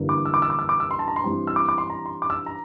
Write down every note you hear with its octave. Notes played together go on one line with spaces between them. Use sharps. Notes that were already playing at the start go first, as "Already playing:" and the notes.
Already playing: G1 G2 E3 G3 A#3
D6
E6
D6
E6
D6
E6
D6
E6
C6
A5
A#5
C6
G2 E3 G3 C4
E6
D6
D6
C6
A#5
C6
D6
E6
A#5